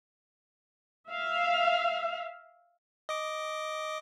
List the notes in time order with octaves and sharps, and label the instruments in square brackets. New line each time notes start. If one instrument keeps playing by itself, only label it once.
[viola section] E5 F5
[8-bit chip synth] D#5 D6